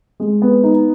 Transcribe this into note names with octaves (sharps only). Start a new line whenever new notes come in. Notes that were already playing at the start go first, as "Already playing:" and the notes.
G#3
B3
D#4